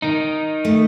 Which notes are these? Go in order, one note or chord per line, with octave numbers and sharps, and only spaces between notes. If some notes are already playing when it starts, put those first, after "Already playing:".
D#3 D#4
A3